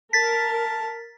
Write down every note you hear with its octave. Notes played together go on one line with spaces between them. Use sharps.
A#4 A5 A6 B6